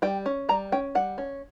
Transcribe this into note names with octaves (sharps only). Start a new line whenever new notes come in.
G3 G5
C#4
G3 A#5
C#4 G5
G3 F#5
C#4